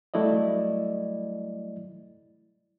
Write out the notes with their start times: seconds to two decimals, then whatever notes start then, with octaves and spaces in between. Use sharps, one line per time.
0.14 F#3 G3 A3 E4 D5 D#5